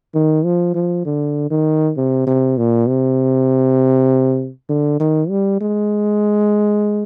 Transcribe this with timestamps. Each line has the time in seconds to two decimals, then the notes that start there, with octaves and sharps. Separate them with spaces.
0.14 D#3
0.45 F3
0.75 F3
1.05 D3
1.51 D#3
1.97 C3
2.27 C3
2.57 A#2
2.87 C3
4.69 D3
5.00 D#3
5.29 G3
5.61 G#3